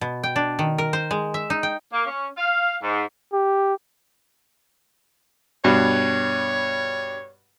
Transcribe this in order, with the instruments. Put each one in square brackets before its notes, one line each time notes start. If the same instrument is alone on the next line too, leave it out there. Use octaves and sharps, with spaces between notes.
[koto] B2
G5
D4
D#3
A#4
C5
G#3
E5
D#4
G5
[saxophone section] A#3
C#4
F5
G#2
[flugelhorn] G4
[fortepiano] G2 B2 [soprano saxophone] C#5